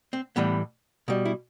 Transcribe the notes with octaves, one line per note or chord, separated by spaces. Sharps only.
C4
A2 E3 G3 B3
B2 G3
E4